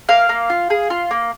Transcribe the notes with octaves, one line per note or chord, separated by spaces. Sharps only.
A#3 F5
A#3
F4
G#4
F4
A#3